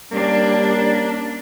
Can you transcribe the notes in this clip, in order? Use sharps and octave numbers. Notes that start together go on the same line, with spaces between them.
G3 A#3 C#4 D4